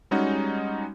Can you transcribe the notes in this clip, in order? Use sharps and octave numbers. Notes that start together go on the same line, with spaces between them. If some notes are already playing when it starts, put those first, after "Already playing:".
G3 G#3 C#4 D#4 F#4